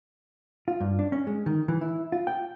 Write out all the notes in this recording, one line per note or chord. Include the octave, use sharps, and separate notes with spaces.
F4
G2
D4
C#4
G#3
D#3
E3
E4
F4
G5